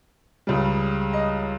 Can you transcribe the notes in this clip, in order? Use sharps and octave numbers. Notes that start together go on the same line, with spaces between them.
C#2 C#3 G3
D#5